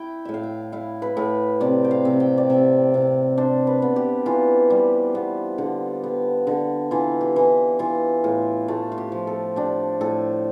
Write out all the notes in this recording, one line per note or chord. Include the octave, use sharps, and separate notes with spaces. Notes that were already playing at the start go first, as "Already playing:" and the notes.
Already playing: E4 G5
A2 E5
F5
G5
E4 F5
B4
A2
C3 D5
G5
F5
C3
G5
D5
C3 E5
C3 D5
D4 C5
B4
B3
G4
E3 F4
G3
B3
D3
B3
D3
E3 F4
G4
E3
E3 F4
A2 F4
A3 F4
F4
G4
F3
A4
D4 G4
A2 A4